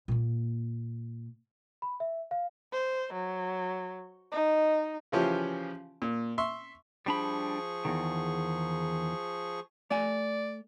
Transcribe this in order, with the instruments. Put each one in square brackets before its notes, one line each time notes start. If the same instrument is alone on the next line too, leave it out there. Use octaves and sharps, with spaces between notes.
[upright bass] A#2 A#3
[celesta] B5
E5
F5
[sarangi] C5
F#3
D#4
[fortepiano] C#3 E3 F3 C#4 F4 G4
A#2
E5 C6 C#6
[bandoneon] F3 G#4 C#6 [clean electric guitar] G3 D4 B5
[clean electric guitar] E2 G#2 D#3
[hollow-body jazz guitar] A3 F5 G#5 [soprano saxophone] D5